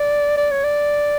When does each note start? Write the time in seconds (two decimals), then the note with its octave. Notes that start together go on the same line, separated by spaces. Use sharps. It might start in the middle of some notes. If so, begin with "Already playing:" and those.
Already playing: D5
0.37 D5
0.51 C#5
0.64 D5